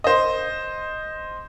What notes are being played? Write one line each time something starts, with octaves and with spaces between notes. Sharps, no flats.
C5 D#5